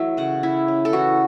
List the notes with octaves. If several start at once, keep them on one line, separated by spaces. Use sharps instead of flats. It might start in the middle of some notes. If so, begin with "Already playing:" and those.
Already playing: E3 F#3 A3 E5
C#3 F#5
C#4 E4
C#4
A4
E3 F#4